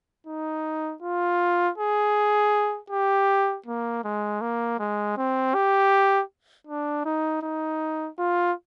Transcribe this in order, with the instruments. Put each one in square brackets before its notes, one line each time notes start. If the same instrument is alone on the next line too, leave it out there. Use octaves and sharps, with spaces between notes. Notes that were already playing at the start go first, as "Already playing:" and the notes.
[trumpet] D#4
F4
G#4
G4
A#3
G#3
A#3
G#3
C4
G4
D4
D#4
D#4
F4